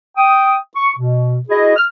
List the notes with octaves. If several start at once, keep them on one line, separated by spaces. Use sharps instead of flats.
G5 D#6
C#6
B2
E4 F#4 G#4 D#5
F6